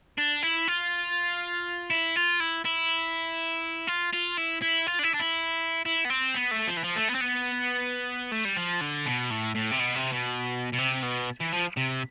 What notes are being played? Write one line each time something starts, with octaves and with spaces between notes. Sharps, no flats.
D4
E4
F4
E4
F4
E4
E4
F4
F4
E4
E4
F4
D4
E4
D4
E4
E4
B3
C4
B3
A3
F3
E3
F3
A3
B3
C4
B3
A3
G3
F3
D3
B2
A2
A2
C3
B2
C3
B2
B2
C3
B2
E3
F3
C3